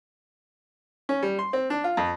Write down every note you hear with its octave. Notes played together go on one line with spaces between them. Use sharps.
C#4
G3
C6
C4
D4
F4
F2